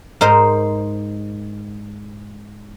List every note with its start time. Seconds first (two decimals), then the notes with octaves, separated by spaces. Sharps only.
0.21 G#2 D#4 A#4 C5